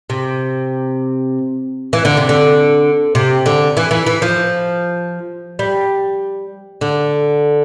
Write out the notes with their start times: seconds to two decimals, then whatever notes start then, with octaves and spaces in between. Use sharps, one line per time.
0.10 C3
1.93 E3
2.05 D3
2.17 C3
2.29 D3
3.15 C3
3.46 D3
3.77 E3
3.91 E3
4.06 E3
4.22 F3
5.59 G3
6.81 D3